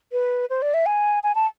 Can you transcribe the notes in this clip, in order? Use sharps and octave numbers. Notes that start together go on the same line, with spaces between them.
B4
C5
D5
E5
G#5
G#5
A5